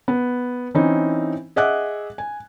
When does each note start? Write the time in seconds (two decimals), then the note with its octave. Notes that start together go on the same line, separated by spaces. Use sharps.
0.08 B3
0.74 E3 C4 C#4 D#4 E4
1.56 G#4 D#5 E5 F#5 D6 F#6
2.18 G#5